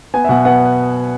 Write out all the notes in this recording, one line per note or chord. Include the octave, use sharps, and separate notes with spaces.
B3 G#5
E5
B2 F#5
B3 F#5